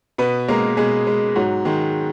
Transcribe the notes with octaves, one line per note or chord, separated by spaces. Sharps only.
B2 B3 B4
G#3 A#3 A#4
B2 G#3 G#4
G#3
G#2 F#3 F#4
D#3 G#3